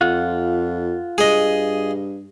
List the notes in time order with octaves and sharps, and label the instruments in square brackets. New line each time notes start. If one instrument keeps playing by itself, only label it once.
[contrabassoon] F2 [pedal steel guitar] F4 F#5
[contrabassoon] G2 [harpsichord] G#4 D#5